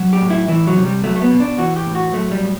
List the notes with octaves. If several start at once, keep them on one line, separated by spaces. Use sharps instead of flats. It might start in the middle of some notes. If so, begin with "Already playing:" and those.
Already playing: F#3
G4
A2
E4
E3 E4
F#3
C3
G3
F#3 A3
A3
B3
B2
D4
E3 F#4
G4
A2
F#4
F#3 A3
G3
A2